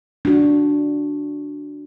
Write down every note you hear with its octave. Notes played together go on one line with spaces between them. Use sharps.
D4 F#4